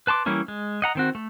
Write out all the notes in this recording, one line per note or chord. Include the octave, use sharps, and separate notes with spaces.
B4 A5 C6 D6
E3 G3 A#3 C#4 E4
G#3
D#5 F#5 A#5
D#3 C4 F#4
A3